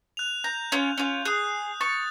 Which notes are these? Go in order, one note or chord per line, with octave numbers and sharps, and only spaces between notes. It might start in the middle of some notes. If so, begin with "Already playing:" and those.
F#6 F7
A#5 G6
C#4 F4
C#4 F4
G#4 D#6 F#6
C#6 A6